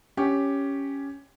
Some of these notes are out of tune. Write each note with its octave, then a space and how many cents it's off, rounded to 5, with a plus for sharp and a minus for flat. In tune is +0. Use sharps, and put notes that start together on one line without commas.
C#4 +5 G4 +0